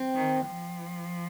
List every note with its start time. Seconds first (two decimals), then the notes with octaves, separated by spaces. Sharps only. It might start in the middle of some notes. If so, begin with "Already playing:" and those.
Already playing: C4
0.15 D#3
0.46 F3